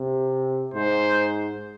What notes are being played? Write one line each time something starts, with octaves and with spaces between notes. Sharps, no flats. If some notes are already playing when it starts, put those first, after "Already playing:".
Already playing: C3
G#2 C5